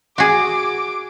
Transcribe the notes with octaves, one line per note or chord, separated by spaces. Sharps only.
F#4 G#4 D6